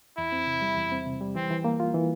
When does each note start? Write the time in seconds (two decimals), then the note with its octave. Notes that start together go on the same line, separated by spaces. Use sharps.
0.18 E2 E4
0.32 C4
0.47 C3
0.62 G3
0.77 E2
0.92 C4
1.06 C3
1.21 G3
1.35 E3 C4
1.51 E3
1.64 A#3
1.80 F4
1.94 E3